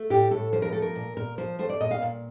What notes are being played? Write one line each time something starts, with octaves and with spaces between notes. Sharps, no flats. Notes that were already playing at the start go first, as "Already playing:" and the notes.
Already playing: A3
A2 G4
A2 A4
F3 C5
A#4
A3 A4
A#4
A#2
A#2 A#4
F3 C5
A3 C5
D5
A#2 D#5
F5
A#2